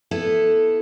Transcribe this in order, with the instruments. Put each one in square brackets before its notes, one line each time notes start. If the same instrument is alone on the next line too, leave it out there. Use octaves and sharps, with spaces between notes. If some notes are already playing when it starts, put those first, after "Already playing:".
[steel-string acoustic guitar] B3 E4 A4